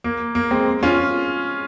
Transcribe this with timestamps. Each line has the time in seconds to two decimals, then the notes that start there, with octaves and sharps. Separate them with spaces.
0.04 A#3
0.35 A#3
0.51 G#3 C4
0.83 C#4 F4